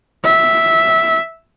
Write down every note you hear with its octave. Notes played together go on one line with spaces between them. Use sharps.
E5